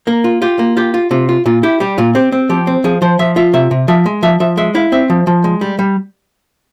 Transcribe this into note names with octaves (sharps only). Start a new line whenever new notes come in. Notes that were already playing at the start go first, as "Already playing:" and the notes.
A#3 A#4
F4
F4 G4
A#3
F4 G4
F4
C3 F4
F4
A#2 F4
E4 G4
G3 G4
A#2 F4
C4 G4
C4
F3 G4
C4
F3 G#4
F3 C5
F3 E5
F4 E5
C3 E5
C3
F3 E5
G#3
F3 E5
F3 E5
G#3 E5
E4 F5
C4 E5
F3
F3
G#3
G3
G3